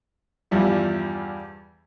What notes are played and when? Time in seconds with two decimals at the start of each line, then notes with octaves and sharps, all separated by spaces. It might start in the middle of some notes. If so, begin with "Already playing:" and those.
0.51 E2 G2 F3 G3 E4